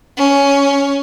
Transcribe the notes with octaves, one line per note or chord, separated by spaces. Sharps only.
C#4